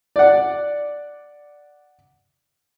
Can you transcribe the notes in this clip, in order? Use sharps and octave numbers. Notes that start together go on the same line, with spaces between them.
D5 F#5